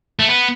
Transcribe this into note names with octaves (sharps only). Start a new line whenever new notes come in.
A3
B3